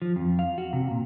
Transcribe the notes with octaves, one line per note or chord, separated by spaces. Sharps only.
F3
F2
F5
F#4
C3
A#2